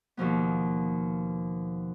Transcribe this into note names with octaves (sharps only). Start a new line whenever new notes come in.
D#2 B2 F3 B3